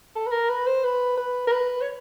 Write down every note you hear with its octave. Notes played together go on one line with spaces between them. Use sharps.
A4
B4
A#4
B4
C5
B4
B4
A#4
B4
C#5